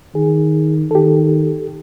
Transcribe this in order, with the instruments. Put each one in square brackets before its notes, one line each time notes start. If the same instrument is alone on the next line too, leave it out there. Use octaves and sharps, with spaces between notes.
[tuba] D#3 [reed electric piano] G#4
[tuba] D#3 [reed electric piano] G4 A4